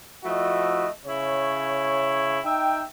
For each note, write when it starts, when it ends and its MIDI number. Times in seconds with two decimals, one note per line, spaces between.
0.24 0.87 53
0.24 0.87 57
0.24 0.87 64
0.24 0.87 66
0.24 0.87 75
1.06 2.39 49
1.06 2.39 64
1.06 2.39 73
2.45 2.82 63
2.45 2.82 76
2.45 2.82 79